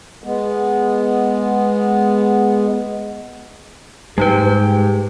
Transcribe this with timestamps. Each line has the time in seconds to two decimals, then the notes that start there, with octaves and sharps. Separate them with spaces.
0.24 G#3 B3
4.18 G#2 G3 G#3 D#4 G4 B4 G5